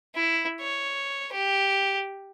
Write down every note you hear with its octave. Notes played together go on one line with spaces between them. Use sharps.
E4
C#5
G4